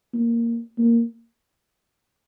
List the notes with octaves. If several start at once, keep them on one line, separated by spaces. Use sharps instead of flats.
A#3
A#3